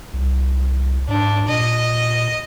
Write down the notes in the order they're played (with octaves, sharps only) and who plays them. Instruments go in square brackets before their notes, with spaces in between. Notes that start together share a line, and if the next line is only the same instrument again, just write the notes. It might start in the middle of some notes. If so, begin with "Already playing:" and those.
[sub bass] C2
[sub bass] G#2 [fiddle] D4
[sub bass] A#2 [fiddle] D#5